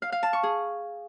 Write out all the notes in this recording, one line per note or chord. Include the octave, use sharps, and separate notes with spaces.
F5
F5
A5
C#6
G#4